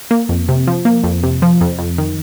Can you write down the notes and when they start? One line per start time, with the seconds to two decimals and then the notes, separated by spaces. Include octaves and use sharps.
0.11 A#3
0.29 F2
0.49 C3
0.67 F3
0.85 A#3
1.04 F2
1.23 C3
1.42 F3
1.61 F2
1.79 F2
1.98 D#3